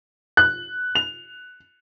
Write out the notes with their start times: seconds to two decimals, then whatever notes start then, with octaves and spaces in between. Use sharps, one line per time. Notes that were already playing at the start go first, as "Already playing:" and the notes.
0.37 F#6
0.95 F7